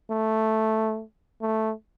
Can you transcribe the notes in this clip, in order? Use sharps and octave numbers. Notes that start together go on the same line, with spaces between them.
A3
A3